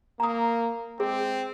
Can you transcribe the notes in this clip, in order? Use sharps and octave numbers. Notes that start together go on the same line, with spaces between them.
A#3 A#5 D#6
G#3 C4 G#4